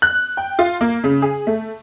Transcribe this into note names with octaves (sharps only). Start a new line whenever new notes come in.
F#6
G5
F4
A#3
C#3
G#4
A3